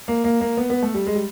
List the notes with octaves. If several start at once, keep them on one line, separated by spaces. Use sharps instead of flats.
A#3
A#3
A#3
B3
B3
A3
G3
G#3
G3